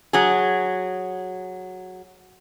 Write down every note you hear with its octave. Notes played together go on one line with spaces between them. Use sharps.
F#3 G#4